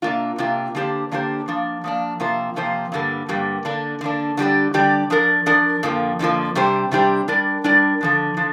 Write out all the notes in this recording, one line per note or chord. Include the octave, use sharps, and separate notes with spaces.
C3 A#3 D4 F4
C3 A#3 D4 F4
D3 A#3 D4 G4 C5
D3 A#3 D4 G4 C5
F3 A#3 D4
F3 A#3 D4
C3 F3 A#3 F4 C5
C3 F3 A#3 F4 C5
G2 D3 G3 A#3
G2 D3 G3 A#3
D3 A#3 D4
D3 A#3 D4
D3 G3 D4 G4 D5
D3 G3 D4 G4 D5
F3 D4 A#4 D5
F3 D4 A#4 D5
F2 D3 F3 A#3
F2 D3 F3 A#3
C3 G3 D4 G4 C5
C3 G3 D4 G4 C5
G3 D4 A#4 D5
G3 D4 A#4 D5
D3 F3 D4
D3 F3 D4